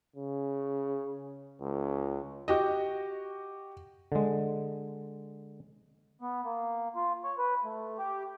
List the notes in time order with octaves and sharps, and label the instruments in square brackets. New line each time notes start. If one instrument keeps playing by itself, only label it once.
[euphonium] C#3
C#2
[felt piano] F#4 G4 D#5
[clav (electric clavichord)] D3 G#3
[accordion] B3
A#3
F4
C#5
B4
A3
G4